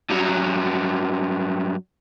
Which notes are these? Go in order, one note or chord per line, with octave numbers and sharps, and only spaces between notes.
G2 F#3